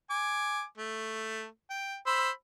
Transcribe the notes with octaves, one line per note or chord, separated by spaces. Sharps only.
G#5 D6
A3
G5
C5 B5 E6